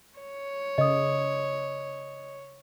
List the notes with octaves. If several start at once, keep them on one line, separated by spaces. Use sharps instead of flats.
C#5
C#3 D#5 D#6